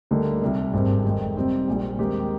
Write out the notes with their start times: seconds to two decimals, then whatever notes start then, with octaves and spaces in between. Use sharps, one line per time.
0.11 D2 D3 G3 A#3 D#4
0.42 C2 A#2 G3
0.73 G#1 G2 D#3 G3 C4
1.05 F1 F2 D#3 G#3
1.36 C3 G3 C4 D#4
1.68 A#1 A#2 G3
1.98 D#2 D#3 G#3 C4 G4